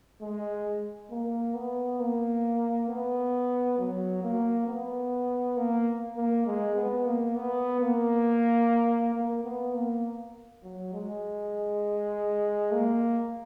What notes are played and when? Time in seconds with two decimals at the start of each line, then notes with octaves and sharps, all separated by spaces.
0.21 G#3
1.10 A#3
1.55 B3
2.00 A#3
2.89 B3
3.79 F#3
4.23 A#3
4.68 B3
5.57 A#3
6.17 A#3
6.47 G#3
6.76 B3
7.06 A#3
7.36 B3
7.81 A#3
9.14 A#3
9.44 B3
9.74 A#3
10.63 F#3
10.94 G#3
12.72 A#3